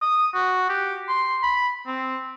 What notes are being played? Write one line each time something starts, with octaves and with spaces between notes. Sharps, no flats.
D#6
F#4
G4
C6
B5
C4